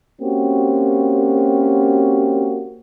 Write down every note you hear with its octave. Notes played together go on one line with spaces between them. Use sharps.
A#3 C4 C#4 F#4 G4